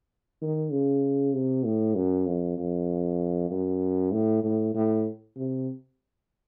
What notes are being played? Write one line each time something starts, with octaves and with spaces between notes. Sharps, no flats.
D#3
C#3
C3
A2
F#2
F2
F2
F#2
A2
A2
A2
C3